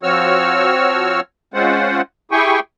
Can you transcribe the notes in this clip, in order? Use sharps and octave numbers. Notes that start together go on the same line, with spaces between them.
F3 C4 F#4 C#5 E6 F6
G#3 C4 C#4 F4 C5 F#5
E4 G4 G#4 G5 G#5 C#6